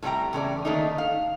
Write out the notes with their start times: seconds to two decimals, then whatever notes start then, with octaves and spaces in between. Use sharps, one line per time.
0.02 A2 C3 G3 D5 G5 A#5
0.33 E2 C#3 A3 D5
0.65 D#3 A3 A#3 D4 D#4
0.98 F5